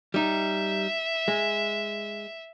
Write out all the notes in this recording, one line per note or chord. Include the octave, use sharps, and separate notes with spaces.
G3 D#4 E5
G#3